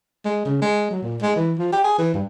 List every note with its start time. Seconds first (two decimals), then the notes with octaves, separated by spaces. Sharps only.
0.25 G#3
0.45 C#3
0.62 G#3
0.91 F#3
1.02 A#2
1.22 G#3
1.36 E3
1.58 F3
1.72 G4
1.84 G#4
1.98 E3
2.14 G2